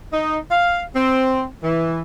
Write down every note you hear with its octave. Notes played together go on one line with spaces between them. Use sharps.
D#4
F5
C4
E3